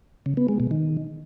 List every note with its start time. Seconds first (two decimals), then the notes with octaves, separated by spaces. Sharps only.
0.26 C#3
0.37 B3
0.48 G#3
0.60 B2
0.71 D#3